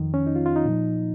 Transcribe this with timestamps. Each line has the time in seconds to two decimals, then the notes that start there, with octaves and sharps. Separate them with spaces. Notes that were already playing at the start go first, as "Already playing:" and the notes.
Already playing: F2 D#3
0.14 C#4
0.27 D#4
0.36 F4
0.46 F4
0.56 D#4
0.66 A#2 F3